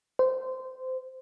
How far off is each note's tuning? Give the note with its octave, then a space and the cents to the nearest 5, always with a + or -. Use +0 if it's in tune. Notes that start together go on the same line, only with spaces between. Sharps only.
C5 -15